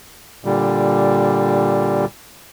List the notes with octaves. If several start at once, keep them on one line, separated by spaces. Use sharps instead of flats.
A#2 D3 G3